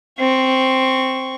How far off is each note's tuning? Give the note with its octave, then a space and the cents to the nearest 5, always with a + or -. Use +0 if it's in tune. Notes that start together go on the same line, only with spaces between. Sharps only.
C4 +0 C#6 +0